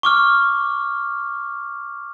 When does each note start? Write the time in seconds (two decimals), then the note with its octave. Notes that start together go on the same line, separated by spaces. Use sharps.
0.03 C#6 D6 F6